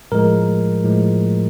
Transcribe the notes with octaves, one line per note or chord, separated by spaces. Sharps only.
A2 F3 G#3 A#4
A2 F3 G#3